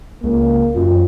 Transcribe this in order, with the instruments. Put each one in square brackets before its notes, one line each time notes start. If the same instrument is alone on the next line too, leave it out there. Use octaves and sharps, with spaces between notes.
[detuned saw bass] C#2 [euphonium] A#3
[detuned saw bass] F#2 [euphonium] F4